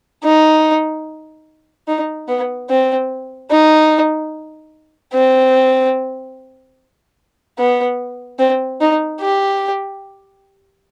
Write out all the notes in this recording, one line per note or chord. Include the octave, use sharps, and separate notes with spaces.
D#4
D#4
B3
C4
D#4
C4
B3
C4
D#4
G4